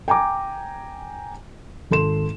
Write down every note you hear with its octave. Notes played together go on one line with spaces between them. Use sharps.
G5 G#5 A#5 D6
G#1 A4 C6 E7